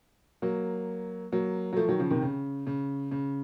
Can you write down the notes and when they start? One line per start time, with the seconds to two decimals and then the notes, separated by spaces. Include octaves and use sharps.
0.42 F#3 A#3
1.32 F#3 A#3
1.73 F#3
1.76 F3 A3
1.88 D#3 F#3
1.99 C#3 F3
2.11 C3 D#3
2.23 C#3
2.67 C#3
3.11 C#3